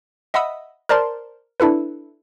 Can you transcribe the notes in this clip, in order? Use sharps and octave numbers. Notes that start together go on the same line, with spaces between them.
D#5 E5 F#5 B5 D#6 E6
A#4 C5 D5 A5 C6
D4 E4 A4 B4